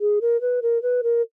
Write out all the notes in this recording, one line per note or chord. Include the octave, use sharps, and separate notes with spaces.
G#4
A#4
B4
A#4
B4
A#4